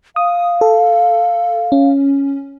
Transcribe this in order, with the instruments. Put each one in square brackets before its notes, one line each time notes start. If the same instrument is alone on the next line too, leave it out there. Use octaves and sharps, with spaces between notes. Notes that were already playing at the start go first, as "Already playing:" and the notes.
[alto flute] F5 [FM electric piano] D#6
[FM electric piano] A4
C#4